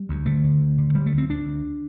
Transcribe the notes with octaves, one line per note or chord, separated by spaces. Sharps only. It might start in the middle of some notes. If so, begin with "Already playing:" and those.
Already playing: G3
D2
D3 A3
D3
D2
D3
D3 G3
A3
D2
C4
D2 D4
D2